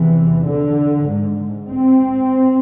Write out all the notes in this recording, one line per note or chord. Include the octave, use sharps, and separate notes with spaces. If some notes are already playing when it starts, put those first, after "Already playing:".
Already playing: E2 C3 E3
D3
G#2
C4